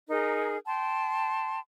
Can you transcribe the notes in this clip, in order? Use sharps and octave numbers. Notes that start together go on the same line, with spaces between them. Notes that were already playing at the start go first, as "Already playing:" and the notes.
D#4 G#4 A#4
G5 A5 C6